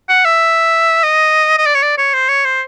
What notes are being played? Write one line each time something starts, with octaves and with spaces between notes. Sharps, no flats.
F#5
E5
D#5
D#5
D5
C#5
D5
C#5
C5
C#5
C5